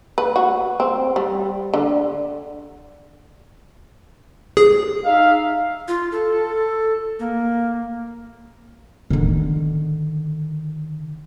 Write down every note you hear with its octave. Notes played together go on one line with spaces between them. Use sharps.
B4
F#4
C4
G3
D3
G#4
D#4 E5 F5
F4
A4
A#3
D3 D#3